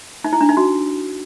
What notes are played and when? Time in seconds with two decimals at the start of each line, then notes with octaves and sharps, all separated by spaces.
0.24 D#4
0.33 E4
0.41 D4
0.49 D#4
0.57 F#4